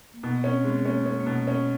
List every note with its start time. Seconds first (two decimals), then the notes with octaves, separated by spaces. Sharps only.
0.13 A#3
0.23 B2 B3
0.44 C4 C#4
0.64 G#3 B3
0.85 A#3 C#4
1.05 A3 C#4
1.20 A#3
1.26 B2
1.33 A3
1.47 C#4